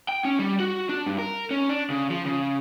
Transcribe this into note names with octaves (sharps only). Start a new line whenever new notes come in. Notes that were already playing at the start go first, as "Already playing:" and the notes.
G5
C#4
G3
F#4
D4
G2
A#4
C#4
D4
C#3
F3
C#3